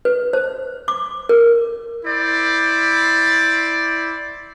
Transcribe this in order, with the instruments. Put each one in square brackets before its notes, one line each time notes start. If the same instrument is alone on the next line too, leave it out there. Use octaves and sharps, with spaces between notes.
[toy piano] B4
C5
D6
A#4
[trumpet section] E4 C5 D5